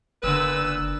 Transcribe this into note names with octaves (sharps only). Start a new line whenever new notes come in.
F#1 A#2 D3 A#3 B3 B4 E6